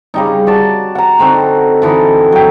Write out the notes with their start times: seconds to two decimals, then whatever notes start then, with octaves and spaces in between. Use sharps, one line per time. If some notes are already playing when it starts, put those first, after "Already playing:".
0.14 C#3 G3 D#4
0.47 F#4 D5 A5
0.95 F#5 A#5
1.19 D3 C4 D#4 F#4
1.82 D3 E3 D#4
2.32 F#3 G5